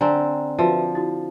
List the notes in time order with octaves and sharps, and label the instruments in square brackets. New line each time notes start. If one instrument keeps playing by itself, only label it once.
[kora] D3 C4 [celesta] G#5 A#5
[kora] F3 [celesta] F#4 B4 E5
[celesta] E4 F#4